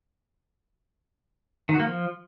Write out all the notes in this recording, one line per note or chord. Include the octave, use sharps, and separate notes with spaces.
D#3
F#4
A#3
F3